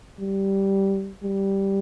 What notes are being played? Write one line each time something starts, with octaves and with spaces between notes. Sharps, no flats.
G3
G3